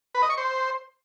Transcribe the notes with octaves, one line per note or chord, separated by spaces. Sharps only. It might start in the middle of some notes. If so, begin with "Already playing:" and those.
B4
D#5
C#6
C5